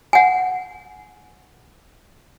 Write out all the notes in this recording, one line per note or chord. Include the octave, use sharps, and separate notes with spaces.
F#5 G#5